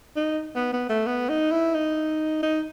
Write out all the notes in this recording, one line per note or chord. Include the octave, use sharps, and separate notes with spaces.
D#4
B3
B3
A3
B3
D#4
E4
D#4
D#4